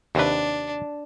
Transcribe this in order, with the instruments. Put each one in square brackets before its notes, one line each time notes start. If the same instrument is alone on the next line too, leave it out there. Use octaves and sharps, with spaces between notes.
[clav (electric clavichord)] D#2 C3 B4 [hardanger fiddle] D4